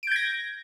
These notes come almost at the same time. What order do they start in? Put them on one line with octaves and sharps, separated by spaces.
D7 G6 G#6 A#6